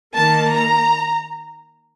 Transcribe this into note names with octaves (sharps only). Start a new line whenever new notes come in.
D#3 A#3 A5
A#5